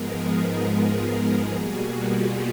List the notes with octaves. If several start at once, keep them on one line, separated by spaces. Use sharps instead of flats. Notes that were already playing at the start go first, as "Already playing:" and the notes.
Already playing: G#2 F3 G#3 B3 G#4 A#4
G#2 F3 G#3 B3
B2 G3 A#3 F#4 G#4
F4 G4